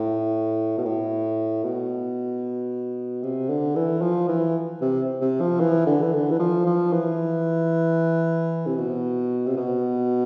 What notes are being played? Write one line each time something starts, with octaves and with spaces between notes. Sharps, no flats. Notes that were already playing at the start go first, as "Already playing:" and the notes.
Already playing: A2
B2
A2
B2
C3
D3
E3
F3
E3
C3
C3
F3
E3
D3
E3
D3
E3
F3
F3
E3
C3
B2
C3
B2